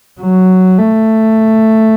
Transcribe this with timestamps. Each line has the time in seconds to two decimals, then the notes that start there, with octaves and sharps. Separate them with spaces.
0.21 F#3
0.78 A3